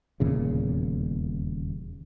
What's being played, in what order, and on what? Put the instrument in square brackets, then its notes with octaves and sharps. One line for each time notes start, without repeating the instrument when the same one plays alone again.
[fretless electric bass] D#1 E2 A#2 C#3